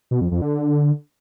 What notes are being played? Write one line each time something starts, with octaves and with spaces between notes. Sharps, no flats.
B2
F2
F2
D3